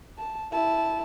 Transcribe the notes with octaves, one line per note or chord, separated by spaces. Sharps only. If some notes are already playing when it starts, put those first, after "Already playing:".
A5
E4 A5